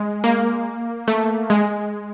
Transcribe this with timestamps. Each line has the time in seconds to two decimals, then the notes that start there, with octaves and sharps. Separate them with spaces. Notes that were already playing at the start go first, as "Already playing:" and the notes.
Already playing: G#3
0.24 A#3
1.08 A3
1.50 G#3